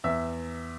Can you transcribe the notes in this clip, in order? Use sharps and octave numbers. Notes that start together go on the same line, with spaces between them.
E2 E5